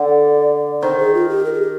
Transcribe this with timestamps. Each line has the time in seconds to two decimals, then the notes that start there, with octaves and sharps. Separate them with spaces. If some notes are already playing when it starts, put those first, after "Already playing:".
Already playing: D3 D5
0.82 D#3 C5
0.99 G#4
1.15 F4
1.29 G4
1.45 A#4
1.54 G#4
1.61 G4